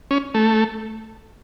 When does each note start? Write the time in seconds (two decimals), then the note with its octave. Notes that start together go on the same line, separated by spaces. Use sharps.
0.11 C#4
0.35 A3